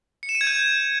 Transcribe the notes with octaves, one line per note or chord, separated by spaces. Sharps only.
C#7
E7
D#7
G#6
G6